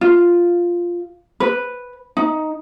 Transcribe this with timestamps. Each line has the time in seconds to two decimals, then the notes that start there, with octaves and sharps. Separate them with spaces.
0.01 F4
1.40 B4
2.17 D#4